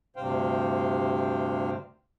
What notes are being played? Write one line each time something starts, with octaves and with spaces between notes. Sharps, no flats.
D2 G2 C3 C5 F5 G5